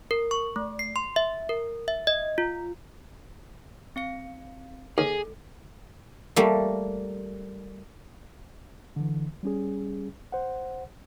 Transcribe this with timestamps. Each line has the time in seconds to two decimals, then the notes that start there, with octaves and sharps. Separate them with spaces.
0.11 A#4
0.31 C#6
0.56 A3
0.79 C7
0.96 C6
1.16 E5
1.49 A#4
1.88 E5
2.07 D#5
2.38 F4
3.96 C4 F5 C#7
4.98 D#2 G#4 A4
6.36 G3 A3 A#3
8.96 D3 E3
9.43 G3 C#4 G#4
10.32 C5 F#5